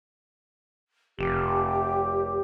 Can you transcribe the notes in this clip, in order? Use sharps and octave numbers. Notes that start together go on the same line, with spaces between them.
F1 G4